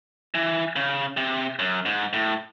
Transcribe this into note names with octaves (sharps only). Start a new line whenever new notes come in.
E3
C#3
C3
F#2
G#2
A2